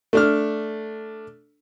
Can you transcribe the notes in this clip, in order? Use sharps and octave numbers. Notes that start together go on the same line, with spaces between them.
A3 D4 F6